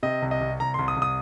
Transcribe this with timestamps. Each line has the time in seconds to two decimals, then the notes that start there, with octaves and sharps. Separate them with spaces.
0.03 C3 D#5
0.22 C2
0.31 D#5
0.41 C2
0.60 C2 A#5
0.74 C2 C6
0.88 D#6
0.97 C2
1.02 D#6